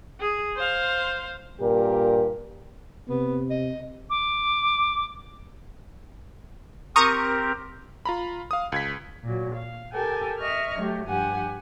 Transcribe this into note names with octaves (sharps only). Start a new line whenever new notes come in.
G#4
C5 F5
G2 A#2 G4 A#4
C3 B3
D#5
D6
C4 G4 A#4 A#5 C#6 D#6
F4 A#5 B5
F5 D#6
C#2 G#6 B6
A#2 F#3
F5
G4 A4 A#4 G5 G#5
D#5 E5 C#6 F6
F#3 A3 G4
G2 F3 G4 F#5 G#5